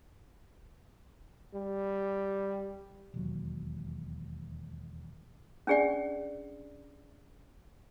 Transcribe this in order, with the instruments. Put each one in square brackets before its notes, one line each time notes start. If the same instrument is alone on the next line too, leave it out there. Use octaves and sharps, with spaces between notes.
[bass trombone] G3
[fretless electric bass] E1 D#2 F#3
[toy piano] C#4 D4 G#4 D5 G5